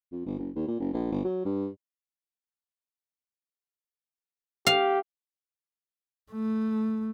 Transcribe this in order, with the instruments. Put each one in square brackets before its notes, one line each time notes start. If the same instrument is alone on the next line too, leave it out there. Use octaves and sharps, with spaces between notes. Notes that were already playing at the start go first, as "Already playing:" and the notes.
[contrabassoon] F2
G1
F#1
D#2
A#2
F#1
A#1
G1
F#3
G2
[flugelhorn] G4 [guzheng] F5
[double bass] A3